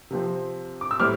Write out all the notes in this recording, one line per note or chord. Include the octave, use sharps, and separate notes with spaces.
C3 F3 C4
D6
E6
A2 G3 C4 E4 D6 F6